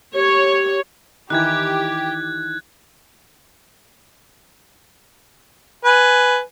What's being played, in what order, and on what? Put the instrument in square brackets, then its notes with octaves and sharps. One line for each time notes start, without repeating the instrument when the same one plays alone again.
[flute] G4 [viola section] C#5
[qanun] D#3 E3 [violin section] G4 [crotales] F#6 G#6
[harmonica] B4 G#5